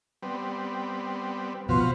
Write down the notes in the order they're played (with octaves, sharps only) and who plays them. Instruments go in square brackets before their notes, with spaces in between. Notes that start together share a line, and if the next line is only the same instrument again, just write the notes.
[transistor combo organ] G3 B3 C4
[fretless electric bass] B2 F3 [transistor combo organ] F#4 B4 F5 [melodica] C5